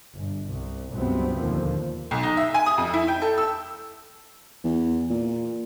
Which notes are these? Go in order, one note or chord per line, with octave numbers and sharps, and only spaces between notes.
G1 B2
C2
C#2 G2 C3 F#3 B3 C4
D#2 A#2 D3 F3
B1
D#4
E5
G#5
D#6
F2
E4
G5
A4
E6
E2
A#2